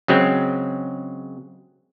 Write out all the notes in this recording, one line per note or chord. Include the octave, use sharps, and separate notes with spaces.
C#3 F#3 G#3 C4